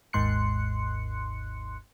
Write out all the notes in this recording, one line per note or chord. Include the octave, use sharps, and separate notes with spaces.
G#1 D#2 G#2 C6 F#6 C#7